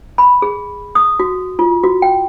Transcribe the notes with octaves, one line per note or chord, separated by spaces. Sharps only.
B5
G#4
D#6
F#4
F4
F#4
G5